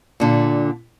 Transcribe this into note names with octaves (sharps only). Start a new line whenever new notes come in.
A#2 D3